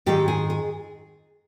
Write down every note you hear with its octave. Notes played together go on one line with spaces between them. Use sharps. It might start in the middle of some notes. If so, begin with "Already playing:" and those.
G#2 D#3 G#3 C4 G4
G#4
G#4